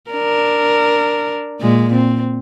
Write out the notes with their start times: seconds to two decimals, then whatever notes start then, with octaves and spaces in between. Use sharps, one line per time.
0.10 D4 A#4
1.60 A#2 G#3
1.93 C4